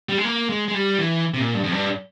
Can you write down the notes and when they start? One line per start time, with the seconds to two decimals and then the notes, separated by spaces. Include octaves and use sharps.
0.09 G3
0.18 G#3
0.24 A#3
0.49 G#3
0.68 G#3
0.74 G3
0.98 E3
1.34 C3
1.39 A#2
1.55 G2
1.64 F2
1.72 G2